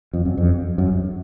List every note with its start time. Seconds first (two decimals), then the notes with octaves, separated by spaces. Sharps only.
0.13 F2
0.25 F#2
0.37 F2
0.78 F#2